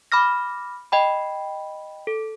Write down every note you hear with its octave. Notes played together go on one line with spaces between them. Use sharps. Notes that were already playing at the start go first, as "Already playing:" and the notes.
B5 D6 F6 A#6
D#5 G5 B5
A4